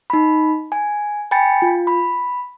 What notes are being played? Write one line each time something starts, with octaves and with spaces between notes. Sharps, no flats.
D#4 B5
G#5
G5 G#5 B5 A6 C#7
F4
B5